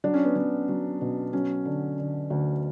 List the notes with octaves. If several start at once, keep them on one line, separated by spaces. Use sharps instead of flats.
F#3 D4
C#4
B3
F#3 C#4
F#3
B2
F#3 C#4
D3
D3
D2